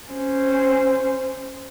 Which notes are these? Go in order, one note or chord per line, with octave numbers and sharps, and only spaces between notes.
C#4 C5